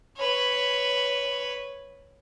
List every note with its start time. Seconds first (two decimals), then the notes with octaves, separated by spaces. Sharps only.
0.16 B4 C#5